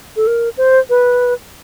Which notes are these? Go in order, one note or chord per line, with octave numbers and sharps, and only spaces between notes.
A4
A#4
C5
B4